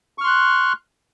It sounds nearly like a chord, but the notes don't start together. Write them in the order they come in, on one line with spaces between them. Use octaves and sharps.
C#6 F6 C6 F#6